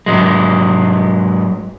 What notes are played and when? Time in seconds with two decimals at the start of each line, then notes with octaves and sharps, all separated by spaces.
0.06 G#2 F#3 G#3